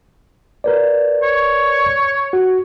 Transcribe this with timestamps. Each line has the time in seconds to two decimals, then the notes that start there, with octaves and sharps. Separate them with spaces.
0.64 A#4 B4 D5
1.23 C#5
2.33 F#4